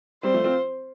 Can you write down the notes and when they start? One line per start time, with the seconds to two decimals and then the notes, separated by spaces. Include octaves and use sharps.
0.23 G3 C4 C5
0.34 F3 A3
0.44 C4 F4